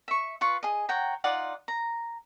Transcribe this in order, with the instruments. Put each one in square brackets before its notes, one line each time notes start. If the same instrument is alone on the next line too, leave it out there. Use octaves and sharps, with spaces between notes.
[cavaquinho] E5 C#6
F4 B4 C#6
G#4 D#5
C#5 F#5 G5 A#5
D#4 F4 D5 F#5
A#5